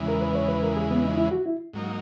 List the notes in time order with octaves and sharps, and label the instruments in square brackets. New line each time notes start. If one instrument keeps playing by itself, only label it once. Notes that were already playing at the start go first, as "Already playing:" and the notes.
Already playing: [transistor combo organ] E2 C#3 E3 G#3
[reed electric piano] A#4
B4
C#5
B4
A#4
G#4
B3
D#4
E4
F#4
E4
[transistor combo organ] G#2 F#3 A#3 D#4